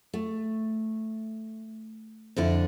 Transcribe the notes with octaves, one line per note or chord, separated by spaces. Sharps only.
A3
F2 D3 E4